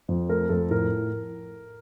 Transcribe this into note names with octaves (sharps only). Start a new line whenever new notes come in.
F2
A3 A#4
F2 A4
A2 A#4